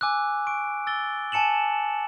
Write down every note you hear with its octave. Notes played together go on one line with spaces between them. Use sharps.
G#5 D6 E6 F#6
C#6 D7
E6 A6 G7
G#5 A5 C#7 E7 F#7